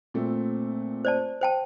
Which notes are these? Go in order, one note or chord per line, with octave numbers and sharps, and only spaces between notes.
A#2 A3 C4
C5 D5 A5
C5 G5 A5